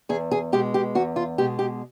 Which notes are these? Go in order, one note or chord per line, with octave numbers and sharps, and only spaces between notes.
E2 G#4
G#4
B2 G#3 G4
G4
E2 F#4
F4
B2 G#3 G4
G4